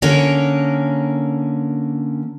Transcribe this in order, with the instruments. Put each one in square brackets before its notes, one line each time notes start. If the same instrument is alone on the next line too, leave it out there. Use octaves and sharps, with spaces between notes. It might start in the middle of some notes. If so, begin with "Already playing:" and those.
[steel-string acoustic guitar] D3 A#3 C#4 A#4